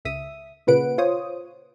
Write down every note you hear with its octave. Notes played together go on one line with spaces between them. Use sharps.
C#2 E5 D#6
A#2 C#3 B4 F#5 D7
F4 C5 C#5 D#6